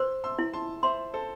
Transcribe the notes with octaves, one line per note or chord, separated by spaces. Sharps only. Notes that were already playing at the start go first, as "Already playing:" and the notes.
Already playing: C5 C6 E6
C6 E6
E4
A5 C6
C5 E5 C6
A4 C5